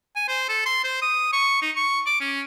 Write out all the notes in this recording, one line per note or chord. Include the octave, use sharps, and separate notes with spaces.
G#5
C5
A4
C6
C5
D#6
C#6
D#4
C#6
D6
C#4